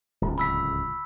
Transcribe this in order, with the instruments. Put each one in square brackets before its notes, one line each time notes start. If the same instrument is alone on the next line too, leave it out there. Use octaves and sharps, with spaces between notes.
[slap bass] D1 C#2
[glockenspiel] B5 E6 B6